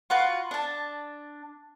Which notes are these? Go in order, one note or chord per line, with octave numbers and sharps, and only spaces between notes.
F4 F#4 B4
D4 A5